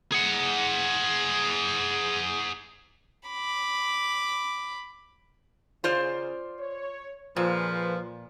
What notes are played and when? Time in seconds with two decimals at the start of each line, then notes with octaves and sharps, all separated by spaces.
0.12 G#4 F#5
3.28 B5 D6
5.84 C#3 F4 C5 D5
6.59 C#5
7.36 A#2 F3 A#3 G#4 B4